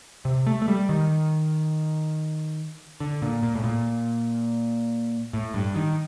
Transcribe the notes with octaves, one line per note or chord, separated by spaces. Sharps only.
C3
A3
A3
G3
D#3
D3
A#2
A#2
A2
A#2
A2
G2
D#3